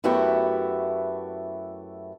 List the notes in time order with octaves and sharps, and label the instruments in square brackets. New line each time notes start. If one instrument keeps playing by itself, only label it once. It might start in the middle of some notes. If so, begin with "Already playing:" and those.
[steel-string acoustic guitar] F#2 A3 B3 E4 F#4 G4